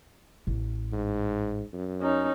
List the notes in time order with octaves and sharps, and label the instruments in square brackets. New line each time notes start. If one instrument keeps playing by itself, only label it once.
[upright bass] A1
[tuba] G#2
F#2
[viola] C#4 D#4